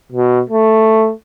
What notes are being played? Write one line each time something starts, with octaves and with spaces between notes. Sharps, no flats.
B2
A3